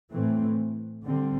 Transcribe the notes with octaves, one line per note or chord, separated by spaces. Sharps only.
A2 E3 A3 C4
D3 G3 C4